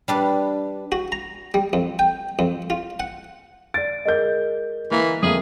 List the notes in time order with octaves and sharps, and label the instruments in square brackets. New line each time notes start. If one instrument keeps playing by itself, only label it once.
[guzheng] G3 D4 B4
[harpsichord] F#4
A#5
G3
F2
G5
F2
F4
F#5
[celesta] D5 D7 [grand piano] A6
[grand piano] G#3 G6 [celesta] G#4 A#4 D#5
[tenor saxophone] E3 [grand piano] A#3
[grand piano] F2 A3 A#3 [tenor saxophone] G#4 [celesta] D#6 D#7 F#7